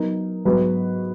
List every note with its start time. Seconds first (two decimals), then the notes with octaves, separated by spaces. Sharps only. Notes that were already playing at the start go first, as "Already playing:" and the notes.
Already playing: F#3 B3 D#4 A#4
0.45 G#2 F#3 B3 F#4 B4